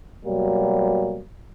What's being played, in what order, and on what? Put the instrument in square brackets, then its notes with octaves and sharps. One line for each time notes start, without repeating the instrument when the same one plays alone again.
[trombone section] B2 F#3 G3 A#3